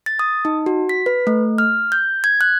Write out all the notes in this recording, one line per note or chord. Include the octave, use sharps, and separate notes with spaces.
A6
D#6
D#4
F#4
B6
B4
A3
F6
G6
G#6
F#6